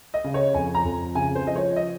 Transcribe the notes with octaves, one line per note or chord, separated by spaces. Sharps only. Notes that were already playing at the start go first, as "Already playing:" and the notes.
D#5
C#3
C#5
F2 G#5
A#5
F2
C#3 G#5
C5
F3 D#5
C#5
D#5